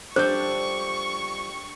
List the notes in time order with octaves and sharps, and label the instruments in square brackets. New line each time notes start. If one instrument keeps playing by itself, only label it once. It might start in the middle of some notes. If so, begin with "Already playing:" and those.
[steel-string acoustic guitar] F3 G3 [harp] D4 A4 G6 [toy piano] C5 [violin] C#6